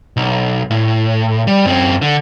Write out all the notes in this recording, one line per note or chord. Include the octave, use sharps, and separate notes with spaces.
B1
A2
G3
F#2 C4
D3